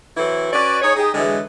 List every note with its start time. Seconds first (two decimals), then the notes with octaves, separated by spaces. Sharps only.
0.17 E3 F#3 C4 E4 A4
0.53 C#4 F#4 B4 D5
0.82 D#4 G#4 C#5
0.96 D#4 G4 G#4
1.14 D3 E3 F#3 G#3